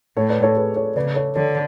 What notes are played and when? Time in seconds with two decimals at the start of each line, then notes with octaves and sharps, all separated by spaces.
0.17 A2 A4 C#5
0.30 B4 D5
0.42 A4 C#5
0.57 G#4 B4
0.76 A4 C#5
0.96 C#3 B4 D5
1.16 A4 C#5
1.35 D3 A4 C#5